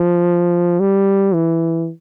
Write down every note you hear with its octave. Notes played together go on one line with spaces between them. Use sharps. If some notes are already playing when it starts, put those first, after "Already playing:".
Already playing: F3
G3
E3